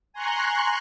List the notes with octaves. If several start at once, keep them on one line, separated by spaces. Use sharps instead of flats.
G#5 A#5 C6 C#6 F#6